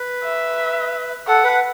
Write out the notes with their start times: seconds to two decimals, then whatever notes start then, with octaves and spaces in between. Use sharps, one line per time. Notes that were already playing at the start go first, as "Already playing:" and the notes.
Already playing: B4
0.24 E5
1.27 A4 F#5
1.44 B4